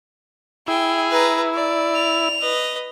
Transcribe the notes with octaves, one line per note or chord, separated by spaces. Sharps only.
E4 G#4 G5
B4 A#5
D5
F7
B4 D#5